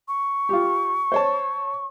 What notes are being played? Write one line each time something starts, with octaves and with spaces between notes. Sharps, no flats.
C#6
F4 G4
C5 C#5 A5